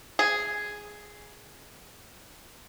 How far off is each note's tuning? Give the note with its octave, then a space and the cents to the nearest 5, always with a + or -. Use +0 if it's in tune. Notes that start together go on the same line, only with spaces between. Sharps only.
G#4 +0